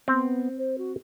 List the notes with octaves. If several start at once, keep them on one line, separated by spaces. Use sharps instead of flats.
B3 C4
C5
F#4